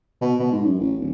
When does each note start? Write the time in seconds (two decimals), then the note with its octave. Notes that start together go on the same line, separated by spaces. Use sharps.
0.22 B2
0.39 B2
0.52 G#2
0.65 F#2
0.80 A1
0.99 D1